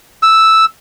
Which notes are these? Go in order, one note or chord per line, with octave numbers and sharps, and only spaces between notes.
E6